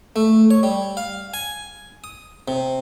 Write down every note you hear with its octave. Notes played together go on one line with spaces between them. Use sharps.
A3
C#5
G3
F5
G#5
D#6
C3